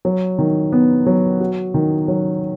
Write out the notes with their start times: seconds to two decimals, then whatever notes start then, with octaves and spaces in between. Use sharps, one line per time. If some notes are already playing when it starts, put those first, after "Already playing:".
0.05 F#3
0.39 D#3
0.72 B3
1.06 F#3
1.40 F#4
1.74 D#3
2.08 F#3